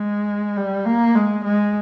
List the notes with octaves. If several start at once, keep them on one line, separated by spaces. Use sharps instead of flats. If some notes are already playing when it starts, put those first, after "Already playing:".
Already playing: G#3
G3
A#3
G#3
G#3